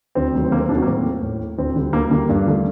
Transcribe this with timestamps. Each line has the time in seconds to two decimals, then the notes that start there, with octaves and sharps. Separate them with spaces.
0.15 D2 C4
0.34 C3 D#3 F#3 A3
0.45 C4
0.51 D2 A#3
0.60 C4
0.69 C3 D#3 F#3 A3 D4
0.78 F#4
0.82 A#3
0.87 A2 C4
1.04 A3
1.23 A2
1.40 A3
1.58 D2 C4
1.76 D3 G3
1.93 D2 A#3
2.11 D3 G3 A#3
2.29 G2
2.47 D3 A3